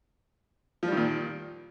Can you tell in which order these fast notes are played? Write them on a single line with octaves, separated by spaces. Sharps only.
F3 G3 D#3 A#2